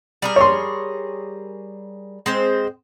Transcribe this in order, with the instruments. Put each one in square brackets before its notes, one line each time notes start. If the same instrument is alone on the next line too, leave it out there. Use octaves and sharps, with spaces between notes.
[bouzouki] G3 G#4 A#4
[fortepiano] C#5 C6
[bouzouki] G#3 C4 C5